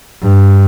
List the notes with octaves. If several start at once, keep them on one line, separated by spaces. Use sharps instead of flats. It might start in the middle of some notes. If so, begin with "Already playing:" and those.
G2